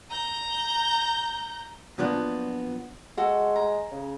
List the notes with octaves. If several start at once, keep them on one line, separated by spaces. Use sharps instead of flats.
A#5 G6
A#2 F3 F#3 B3 D4
G#3 F#4 A4
A#5
C#3